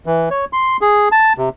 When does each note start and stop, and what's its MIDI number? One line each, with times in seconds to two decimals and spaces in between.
0.06 0.29 52
0.31 0.45 73
0.53 0.77 84
0.81 1.09 68
1.12 1.33 81
1.38 1.49 48